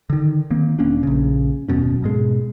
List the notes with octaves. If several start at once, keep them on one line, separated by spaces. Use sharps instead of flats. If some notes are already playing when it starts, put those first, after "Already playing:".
D3 D#3
D#3 A#3 C4
E1 A#3 C#4 D4
A#1 C#3
D#1 F#2 B2 C#4
G#2 B2 G#3